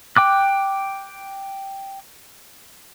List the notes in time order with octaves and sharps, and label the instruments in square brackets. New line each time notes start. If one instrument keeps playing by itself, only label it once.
[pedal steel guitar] G5 D6 F#6